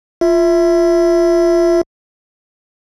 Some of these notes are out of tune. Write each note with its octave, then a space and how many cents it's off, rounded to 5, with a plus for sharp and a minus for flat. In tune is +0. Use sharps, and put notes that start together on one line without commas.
F4 -10 E5 +0